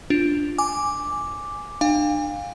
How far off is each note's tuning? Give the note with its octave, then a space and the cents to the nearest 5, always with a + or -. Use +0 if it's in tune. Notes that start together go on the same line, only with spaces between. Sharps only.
D4 +0 F4 +0
G#5 +0 D6 +0
D4 +35 F5 +20 G#5 -45